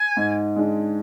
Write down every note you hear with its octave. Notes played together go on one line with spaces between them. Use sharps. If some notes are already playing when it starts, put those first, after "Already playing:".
Already playing: G#5
G#2
G#3 D4